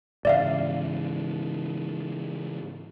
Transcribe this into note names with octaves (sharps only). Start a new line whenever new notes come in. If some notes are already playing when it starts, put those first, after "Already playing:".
G#2 C#3 E3 D5 E5 F5